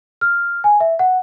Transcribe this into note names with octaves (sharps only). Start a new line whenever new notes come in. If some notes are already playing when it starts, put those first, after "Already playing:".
F6
G#5
E5
F#5